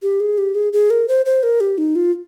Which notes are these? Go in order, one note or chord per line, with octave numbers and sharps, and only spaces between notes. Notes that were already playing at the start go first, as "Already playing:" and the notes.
G4
G#4
G4
G#4
G#4
A#4
C5
C5
A#4
G4
D#4
F4